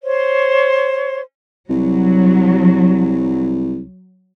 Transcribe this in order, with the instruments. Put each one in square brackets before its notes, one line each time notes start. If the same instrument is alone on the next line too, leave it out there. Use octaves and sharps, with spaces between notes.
[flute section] C5 C#5 C6
[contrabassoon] C2 [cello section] F#3